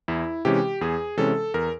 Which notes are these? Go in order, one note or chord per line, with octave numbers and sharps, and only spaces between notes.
E2 E4
C3 E3 G#3 C#4 G4
E2 G#4
C3 E3 G#3 C#4 A4
E2 A#4